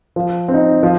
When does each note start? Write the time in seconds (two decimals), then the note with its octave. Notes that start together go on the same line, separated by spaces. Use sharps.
0.16 F3
0.48 C4
0.54 D#4
0.83 F3